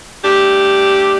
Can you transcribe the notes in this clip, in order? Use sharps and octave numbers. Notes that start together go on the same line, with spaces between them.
A3 D4 G4